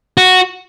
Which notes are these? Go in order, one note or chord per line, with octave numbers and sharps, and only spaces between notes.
F#4